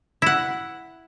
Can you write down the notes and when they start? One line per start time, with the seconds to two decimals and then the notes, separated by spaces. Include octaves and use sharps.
0.22 E4 F#5